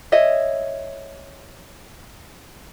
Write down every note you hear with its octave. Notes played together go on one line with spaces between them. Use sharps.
C#5 D#5 E5